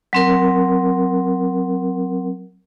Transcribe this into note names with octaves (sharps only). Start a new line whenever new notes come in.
F#3 C4 A#4